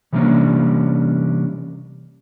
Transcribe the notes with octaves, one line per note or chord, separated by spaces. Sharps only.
C3 E3 G3 A#3 C#4 D4